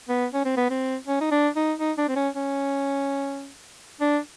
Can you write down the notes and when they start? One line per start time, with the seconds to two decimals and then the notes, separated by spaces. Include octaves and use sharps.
0.09 B3
0.34 C#4
0.45 C4
0.57 B3
0.70 C4
1.07 C#4
1.21 D#4
1.31 D4
1.56 D#4
1.79 D#4
1.98 D4
2.08 C4
2.16 C#4
2.35 C#4
4.01 D4